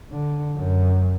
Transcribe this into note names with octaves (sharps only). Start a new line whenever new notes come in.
D3
F#2